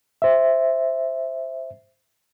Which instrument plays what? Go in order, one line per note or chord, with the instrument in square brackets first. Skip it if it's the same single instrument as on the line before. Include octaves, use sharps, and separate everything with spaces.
[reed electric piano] C5 E5